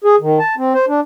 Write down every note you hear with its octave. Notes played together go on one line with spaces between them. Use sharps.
G#4
D#3
A5
C4
C5
D4